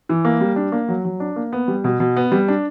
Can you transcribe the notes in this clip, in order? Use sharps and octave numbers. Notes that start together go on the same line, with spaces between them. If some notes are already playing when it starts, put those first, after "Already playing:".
E3
A#3
G3
D4
A#3
F#3
F#3
D4
A#3
B3
G3
B2
B2
B3
G3
D4